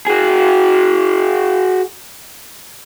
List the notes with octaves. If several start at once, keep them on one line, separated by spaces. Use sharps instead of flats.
F#4 G#4